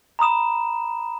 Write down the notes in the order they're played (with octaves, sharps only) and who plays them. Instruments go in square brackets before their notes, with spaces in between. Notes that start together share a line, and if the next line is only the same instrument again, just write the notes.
[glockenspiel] A#5 B5 D#6 E7